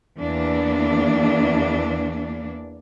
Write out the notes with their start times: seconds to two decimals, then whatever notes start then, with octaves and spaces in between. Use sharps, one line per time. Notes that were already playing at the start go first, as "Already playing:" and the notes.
0.19 E2 E3 A#3 D4